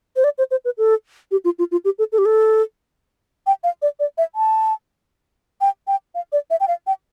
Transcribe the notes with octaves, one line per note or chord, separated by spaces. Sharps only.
C5
D5
C5
C5
B4
A4
G4
F4
F4
F4
G4
A4
A4
G4
A4
G5
F5
D5
D5
E5
A5
G5
G5
F5
D5
E5
G5
F5
G5